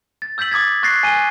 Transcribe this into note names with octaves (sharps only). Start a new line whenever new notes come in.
A6
E6 G6 A6 B6 F#7
D6 D#6 G#6 A6
C#6 F#6 A6 A#6 C7
G#5 C7 D#7 G7